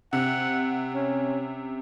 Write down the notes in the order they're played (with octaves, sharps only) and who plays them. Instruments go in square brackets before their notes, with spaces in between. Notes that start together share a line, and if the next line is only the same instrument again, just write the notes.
[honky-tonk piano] C3 [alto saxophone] F#5
[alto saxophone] C#4